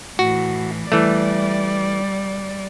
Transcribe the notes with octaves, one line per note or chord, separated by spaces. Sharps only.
A2 E3 F#4
E3 G3 A3 D5